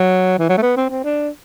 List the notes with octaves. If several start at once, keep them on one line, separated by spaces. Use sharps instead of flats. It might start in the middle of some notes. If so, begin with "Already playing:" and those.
Already playing: F#3
E3
F#3
A3
B3
C4
C4
D4